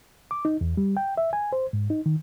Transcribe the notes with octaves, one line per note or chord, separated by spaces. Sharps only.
D6
D#4
E2
G3
G5
E5
G#5
C5
G#2
D#4
D#3